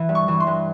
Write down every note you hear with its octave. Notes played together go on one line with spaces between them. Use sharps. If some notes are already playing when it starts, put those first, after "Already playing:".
Already playing: E3
G2
C#6
E3
C6
G2